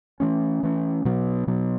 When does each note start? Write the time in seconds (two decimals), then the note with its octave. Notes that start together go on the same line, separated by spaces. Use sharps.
0.20 E3 A3 C#4
0.63 E3 A3 C#4
1.05 B2 F#3 B3
1.47 B2 F#3 B3